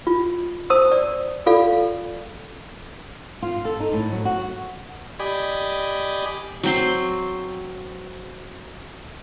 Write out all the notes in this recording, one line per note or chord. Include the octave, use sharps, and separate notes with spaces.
F4
C5 A5 D#6 E6
D5
F4 A4 D5 F5
F4
A4
D#4
A2
F#3
F#4
G4 D5 D#5 G#5 B5
F#3 C4 C6